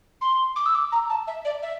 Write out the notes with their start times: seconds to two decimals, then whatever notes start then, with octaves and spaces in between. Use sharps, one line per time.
0.21 C6
0.56 D6
0.65 E6
0.75 D6
0.92 A#5
1.09 A5
1.27 E5
1.45 D5
1.62 E5